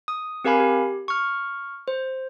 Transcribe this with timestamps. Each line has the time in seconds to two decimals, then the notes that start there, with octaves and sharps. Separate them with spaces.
0.08 D#6
0.44 C4 G4 A#4 F5 G#5 B5
0.60 G4
1.08 C#6 F6
1.88 C5